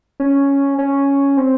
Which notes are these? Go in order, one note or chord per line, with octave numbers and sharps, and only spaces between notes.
C#4
C#4
C4